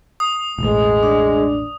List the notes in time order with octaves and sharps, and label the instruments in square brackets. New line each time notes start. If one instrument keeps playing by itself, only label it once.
[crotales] D#6
[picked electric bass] E1 A1 [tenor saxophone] G#3
[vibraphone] D4 D5